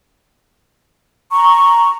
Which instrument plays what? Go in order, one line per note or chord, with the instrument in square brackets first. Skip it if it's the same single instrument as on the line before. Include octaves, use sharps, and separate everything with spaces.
[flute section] A#5 C#6